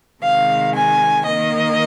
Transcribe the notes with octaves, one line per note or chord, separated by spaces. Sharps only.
C3 D#3 G#3 F5
G#5
D#3 A#3 D#5